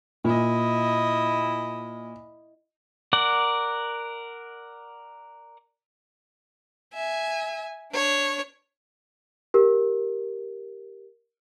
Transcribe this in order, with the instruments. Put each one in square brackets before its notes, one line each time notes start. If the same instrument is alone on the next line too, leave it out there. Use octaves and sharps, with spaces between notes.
[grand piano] A#2 [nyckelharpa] E4 D#5
[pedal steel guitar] A#4 D5 F#5
[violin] E5 G#5
D4 C#5
[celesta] G4 A#4